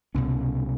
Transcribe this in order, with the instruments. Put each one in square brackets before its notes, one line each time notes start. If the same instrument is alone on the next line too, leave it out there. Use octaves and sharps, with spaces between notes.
[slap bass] C2 B2 C#4